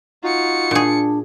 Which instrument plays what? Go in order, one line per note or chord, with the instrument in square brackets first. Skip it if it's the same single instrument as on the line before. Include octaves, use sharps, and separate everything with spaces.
[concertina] D#4 F#4 [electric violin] F4 C#7
[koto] A#2 G#4 [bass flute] D4